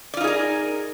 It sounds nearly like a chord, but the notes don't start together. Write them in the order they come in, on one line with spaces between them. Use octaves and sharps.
D5 F4 D#4 G#4 A#4